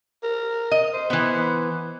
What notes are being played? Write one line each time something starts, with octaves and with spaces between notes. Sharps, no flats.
A#4
D#5
C5
E3 B3